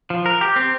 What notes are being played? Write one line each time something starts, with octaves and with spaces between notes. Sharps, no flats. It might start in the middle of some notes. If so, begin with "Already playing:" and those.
F3
A#4
G4
C4